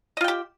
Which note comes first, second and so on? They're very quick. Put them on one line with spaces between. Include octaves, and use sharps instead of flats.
D#5 F4 G5 G4